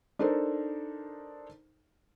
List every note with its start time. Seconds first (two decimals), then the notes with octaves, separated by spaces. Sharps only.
0.19 D4 D#4 A4 A#4 C5